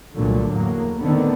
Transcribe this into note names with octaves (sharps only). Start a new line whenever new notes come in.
C2 A#2 D3 F#3 A3
E2 A2 F#3 A#3
D3 D#3 A3 B3 C4